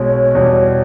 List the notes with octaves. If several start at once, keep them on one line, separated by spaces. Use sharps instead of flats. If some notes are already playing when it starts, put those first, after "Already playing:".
Already playing: B1 B2 G#3 C#5
E2 B2 G3